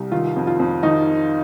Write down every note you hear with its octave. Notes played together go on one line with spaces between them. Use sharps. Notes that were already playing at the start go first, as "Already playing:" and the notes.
Already playing: C2 G3
D#3 F4
F2
F4
F2
D#3 D#4